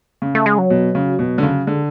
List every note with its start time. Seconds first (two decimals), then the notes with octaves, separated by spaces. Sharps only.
0.22 C#3
0.35 A3
0.46 G#3
0.58 F#3
0.70 B2
0.95 C#3
1.19 B2
1.38 D3
1.43 C#3
1.67 D3 G#3